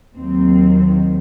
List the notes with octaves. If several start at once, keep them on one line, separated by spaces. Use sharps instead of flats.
D#2 D#3 F#3 C4